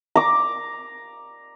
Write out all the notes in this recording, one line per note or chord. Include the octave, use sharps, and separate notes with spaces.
A#5 D6